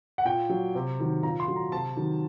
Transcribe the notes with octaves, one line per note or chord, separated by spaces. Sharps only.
F#5
A#2 G5
F#3
C3
D#3 F#3
A#2 A#5
C6
F#3
A#5
C3 A5
D#3 F#3